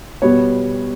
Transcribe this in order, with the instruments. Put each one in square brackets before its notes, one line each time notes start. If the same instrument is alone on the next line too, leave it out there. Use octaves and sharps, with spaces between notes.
[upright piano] B2 G3 B3 C#5